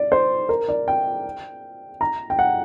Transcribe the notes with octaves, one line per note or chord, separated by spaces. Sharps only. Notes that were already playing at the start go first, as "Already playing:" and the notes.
Already playing: D5
C5
A#4
D5
G5
A#5
G5
F#5